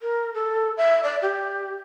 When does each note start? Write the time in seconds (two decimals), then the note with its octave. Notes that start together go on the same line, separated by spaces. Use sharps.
0.01 A#4
0.34 A4
0.77 E5
1.03 D5
1.22 G4